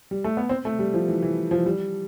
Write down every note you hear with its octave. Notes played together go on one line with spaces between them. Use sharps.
G3
A3
B3
C4
A3
G3
F3
E3
E3
F3
G3